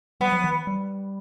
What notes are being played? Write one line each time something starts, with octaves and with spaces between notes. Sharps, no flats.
G3 B3
F#3
E3
G3